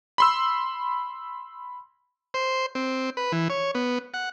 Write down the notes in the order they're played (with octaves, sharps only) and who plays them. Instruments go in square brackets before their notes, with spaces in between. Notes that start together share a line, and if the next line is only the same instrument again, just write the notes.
[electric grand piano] B5 C6 E6
[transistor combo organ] C5
C4
B4
E3
C#5
B3
F#5